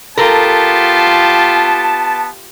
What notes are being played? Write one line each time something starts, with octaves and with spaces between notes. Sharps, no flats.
B3 F4 G4 A4 A#4 A5